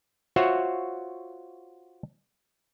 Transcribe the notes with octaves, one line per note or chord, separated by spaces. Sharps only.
F4 F#4 C5 C#5 E5 F#5